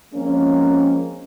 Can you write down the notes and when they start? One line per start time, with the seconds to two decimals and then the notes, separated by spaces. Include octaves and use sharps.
0.14 F3 G#3 A#3 C4 C#4